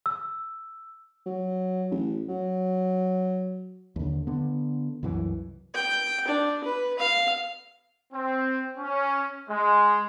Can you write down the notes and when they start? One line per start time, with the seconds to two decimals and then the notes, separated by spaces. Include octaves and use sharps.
0.06 E6
1.26 F#3
1.91 A1
2.28 F#3
3.96 D#2 D3
4.27 D3 B3
5.03 C2 F#2 E3
5.74 G5
6.27 D4
6.63 B4
6.99 F5
8.13 C4
8.78 C#4
9.49 G#3